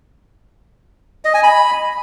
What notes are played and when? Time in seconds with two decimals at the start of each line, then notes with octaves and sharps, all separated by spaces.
1.25 D#5
1.34 G#5
1.43 B5